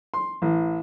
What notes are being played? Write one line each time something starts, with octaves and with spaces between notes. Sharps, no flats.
C6
A1